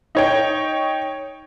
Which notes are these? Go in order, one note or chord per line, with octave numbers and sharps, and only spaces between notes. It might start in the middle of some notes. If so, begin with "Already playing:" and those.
D#4 C#5 G5